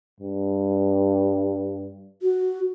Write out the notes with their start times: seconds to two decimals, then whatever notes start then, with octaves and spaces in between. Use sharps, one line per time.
0.20 G2
2.22 F#4